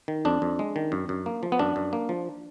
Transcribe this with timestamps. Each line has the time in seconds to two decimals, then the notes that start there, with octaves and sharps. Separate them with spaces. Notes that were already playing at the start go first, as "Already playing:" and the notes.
0.08 D#3
0.25 F2 D4
0.42 F2
0.59 G#3
0.76 D#3
0.92 F#2
1.09 F#2
1.26 A#3
1.43 F3
1.52 B3
1.59 F#2 D4
1.76 F#2
1.93 A#3
2.09 F3